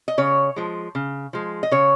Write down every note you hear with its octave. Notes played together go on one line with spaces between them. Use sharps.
D#5
C#3 C#5
F3 G#3
C#3
F3 G#3
D#5
C#3 C#5